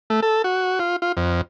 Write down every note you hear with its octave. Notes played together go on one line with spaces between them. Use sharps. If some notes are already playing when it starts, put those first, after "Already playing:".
A3
A4
F#4
F4
F4
F2